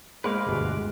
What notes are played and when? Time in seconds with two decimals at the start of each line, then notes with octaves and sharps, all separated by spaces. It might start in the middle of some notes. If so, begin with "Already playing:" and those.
0.24 G#3 A#3 B4 C5 D5 F5
0.49 G1 D2 B2